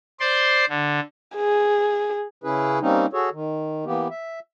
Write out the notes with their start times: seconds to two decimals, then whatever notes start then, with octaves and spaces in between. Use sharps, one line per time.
0.20 C5 D5 C6
0.69 D3
1.36 G#4
2.44 C#3 C#4 E4 G#4 B4
2.81 G3 A#3 C4 C#4 D#4
3.13 F#4 G#4 A4 C#5
3.33 D#3
3.85 E3 A#3 B3 G4
4.11 E5